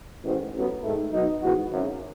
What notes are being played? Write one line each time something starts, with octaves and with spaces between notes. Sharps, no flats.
A1 G#2 D#3
A1 A2 F#3 B3
G#2 D#3 A3
B2 F#3 B3 D#4
G#2 E3 B3 F#4
G#1 F#2 C#3